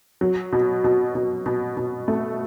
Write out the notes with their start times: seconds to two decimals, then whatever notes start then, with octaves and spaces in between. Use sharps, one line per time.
0.21 F#3
0.53 B2
0.84 B2
1.15 B2
1.46 B2
1.77 B2
2.08 A3